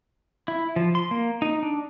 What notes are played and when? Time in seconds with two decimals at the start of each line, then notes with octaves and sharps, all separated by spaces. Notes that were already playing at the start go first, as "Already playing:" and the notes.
0.48 E4
0.76 F3
0.95 C6
1.11 A#3
1.42 D#4
1.63 D4